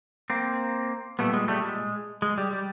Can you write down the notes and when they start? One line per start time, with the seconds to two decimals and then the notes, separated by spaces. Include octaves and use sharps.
0.30 A#3 C4
1.19 A#2 G3 A3 B3
1.33 G#3
1.48 G3 A3
1.63 G#3
2.22 G#3
2.38 G3
2.53 G3